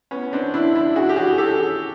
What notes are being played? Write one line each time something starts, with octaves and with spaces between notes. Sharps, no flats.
B3 C#4
C4 D4
D4 E4
D4 E4
F#4 G#4
G4
F#4 G#4
G4 A4